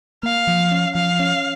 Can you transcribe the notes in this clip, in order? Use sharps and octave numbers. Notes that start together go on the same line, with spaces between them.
A#3 F5
F3
C#4
F3 F5
C#4